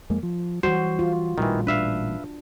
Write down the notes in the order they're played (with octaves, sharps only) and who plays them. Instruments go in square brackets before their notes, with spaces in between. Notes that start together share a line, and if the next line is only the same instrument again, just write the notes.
[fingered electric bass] F2 G#3 A#3
F3
[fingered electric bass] E3 G3 [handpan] F#4 [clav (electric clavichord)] C5
[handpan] F4
[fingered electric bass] A1 A#2 G3 [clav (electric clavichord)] D#3 E3
[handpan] D4 [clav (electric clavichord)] B4 E5 F5